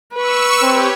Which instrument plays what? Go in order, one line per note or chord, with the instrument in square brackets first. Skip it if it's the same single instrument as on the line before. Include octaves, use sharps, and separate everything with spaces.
[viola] B4 [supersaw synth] C#6 E6
[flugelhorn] C4 [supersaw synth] G4 C#5